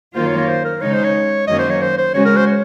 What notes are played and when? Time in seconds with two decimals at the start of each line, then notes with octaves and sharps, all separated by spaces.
0.15 F#2 D#3 A#3 F4 C5
0.27 C#5
0.37 C#5
0.48 C5
0.65 A#4
0.81 C#3 G#3 D#4 C#5
0.93 C5
1.04 C#5
1.47 F#2 D#3 F#3 A#3 C#4 D#5
1.59 C5
1.70 C#5
1.82 C5
1.98 C5
2.14 C#3 G#3 C#4 F#4 C#5
2.25 A#4
2.36 C5
2.47 C#5